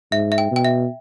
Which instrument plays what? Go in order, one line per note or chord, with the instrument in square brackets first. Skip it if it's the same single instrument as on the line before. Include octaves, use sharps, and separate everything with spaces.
[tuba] G#2 [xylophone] E5
[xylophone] E5
G5
[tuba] B2
[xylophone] G5
E5